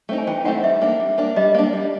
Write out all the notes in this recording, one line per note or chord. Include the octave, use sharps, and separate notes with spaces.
A3 C4 D#4
G#5
E3 G5
A3 C4 D#4 F#5
G3 E5
A#3 D4
G3
A#3 D4
G3 D#5
A#3 D4
G3